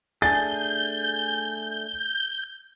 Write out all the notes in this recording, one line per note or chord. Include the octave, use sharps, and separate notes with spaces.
A3 D4 G#4 G#5 G6 A6